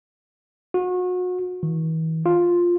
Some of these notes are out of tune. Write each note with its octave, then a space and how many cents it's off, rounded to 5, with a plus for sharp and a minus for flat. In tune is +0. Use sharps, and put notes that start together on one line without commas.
F#4 -35
E3 -45
F4 +5